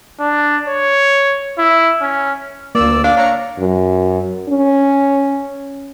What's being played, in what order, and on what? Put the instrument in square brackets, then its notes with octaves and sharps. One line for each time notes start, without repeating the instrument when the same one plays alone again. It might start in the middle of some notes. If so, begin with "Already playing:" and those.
[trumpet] D4
C#5
E4
C#4
[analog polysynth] D2 E6 [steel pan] A#3 [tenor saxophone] D5
[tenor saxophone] D4 [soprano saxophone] F5
[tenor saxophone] D4 [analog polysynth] C#5 A#5 C#7
[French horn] F#2
C#4